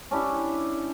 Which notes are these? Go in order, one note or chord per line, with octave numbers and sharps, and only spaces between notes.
C#4 D4 E4 G4